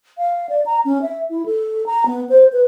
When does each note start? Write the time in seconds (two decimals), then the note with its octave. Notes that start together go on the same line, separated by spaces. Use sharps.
0.18 F5
0.49 D5
0.66 A#5
0.85 C#4
1.02 E5
1.30 E4
1.46 A4
1.86 A#5
2.06 B3
2.29 C5
2.53 B4